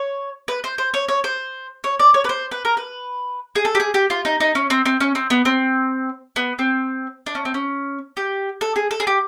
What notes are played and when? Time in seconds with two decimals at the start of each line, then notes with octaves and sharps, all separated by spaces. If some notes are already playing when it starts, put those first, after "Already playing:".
Already playing: C#5
0.48 B4
0.64 C5
0.78 C5
0.94 C#5
1.09 C#5
1.24 C5
1.84 C#5
2.00 D5
2.14 C#5
2.24 B4
2.29 C5
2.51 B4
2.65 A#4
2.77 B4
3.56 G#4
3.65 A4
3.75 G4
3.80 G#4
3.94 G4
4.10 F4
4.25 D#4
4.40 D#4
4.55 C#4
4.70 C4
4.85 C4
5.00 C#4
5.15 C4
5.30 B3
5.45 C4
6.36 B3
6.59 C4
7.26 D4
7.35 C#4
7.45 C4
7.54 C#4
8.17 G4
8.61 A4
8.76 G#4
8.91 A4
9.00 G#4
9.07 G4